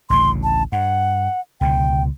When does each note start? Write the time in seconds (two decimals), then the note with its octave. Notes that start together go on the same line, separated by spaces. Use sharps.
0.10 A1 D2 C#3 C6
0.43 A5
0.72 G2 F#5
1.61 C#2 B2 D3 G5